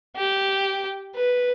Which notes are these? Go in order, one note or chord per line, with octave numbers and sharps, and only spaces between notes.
G4
B4